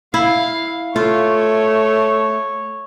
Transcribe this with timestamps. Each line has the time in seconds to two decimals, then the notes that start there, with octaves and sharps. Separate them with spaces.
0.14 E4 F5
0.96 A3 F4 C#5